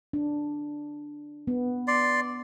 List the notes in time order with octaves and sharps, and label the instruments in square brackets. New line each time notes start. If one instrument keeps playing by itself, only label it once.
[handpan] D4
B3
[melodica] D5 C6